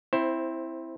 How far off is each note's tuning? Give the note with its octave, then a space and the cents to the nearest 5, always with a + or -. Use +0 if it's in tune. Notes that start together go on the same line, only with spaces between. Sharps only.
C4 -5 E4 +0 C5 +15